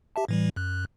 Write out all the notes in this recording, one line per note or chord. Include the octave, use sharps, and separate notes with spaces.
G4 E5 A5
A2 E3 G3
F#2 F#6